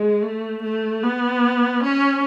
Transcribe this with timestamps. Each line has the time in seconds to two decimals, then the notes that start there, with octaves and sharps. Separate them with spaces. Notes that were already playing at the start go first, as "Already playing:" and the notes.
Already playing: G#3
0.22 A3
0.63 A3
1.03 B3
1.83 C#4